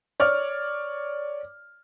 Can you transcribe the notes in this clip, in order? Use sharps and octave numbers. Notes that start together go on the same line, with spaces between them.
C#5 D5 F6